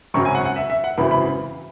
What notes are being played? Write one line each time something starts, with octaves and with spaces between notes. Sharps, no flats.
G#1 F#2 C#3 F#3 C#4 C#6
G#5
F#5
F#5
E5
E5
F#5
G#1 F#2 C#3 E3 B5
B5